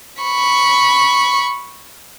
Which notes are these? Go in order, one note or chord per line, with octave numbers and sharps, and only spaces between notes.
B5 C#6